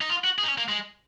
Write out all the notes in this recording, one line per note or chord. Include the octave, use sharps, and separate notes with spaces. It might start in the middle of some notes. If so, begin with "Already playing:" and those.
D#4
F4
F#4
G#4
D#4
C#4
A#3
G#3